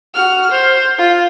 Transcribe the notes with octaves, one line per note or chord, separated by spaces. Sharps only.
F#4 F6
C5
F4